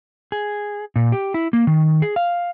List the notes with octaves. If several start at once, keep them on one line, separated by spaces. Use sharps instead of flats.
G#4
A#2
G4
E4
A#3
D#3
G#4
F5